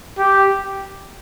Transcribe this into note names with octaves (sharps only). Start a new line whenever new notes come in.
G4